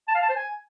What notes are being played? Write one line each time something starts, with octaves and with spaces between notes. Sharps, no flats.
A5
F5
A5
C5
G#5